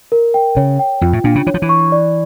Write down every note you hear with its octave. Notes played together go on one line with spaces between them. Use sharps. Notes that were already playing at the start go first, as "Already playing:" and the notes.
A#4
G5
C#3 C#5
G5
F2 F4
A2
A#2 D4
C#3
E3 C#5
F3
E3
C#6
D5